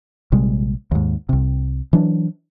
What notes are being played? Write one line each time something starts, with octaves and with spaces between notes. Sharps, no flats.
A#1 C3 G3 G#3
D#2 G#2
C2 C3
E3 F#3 D4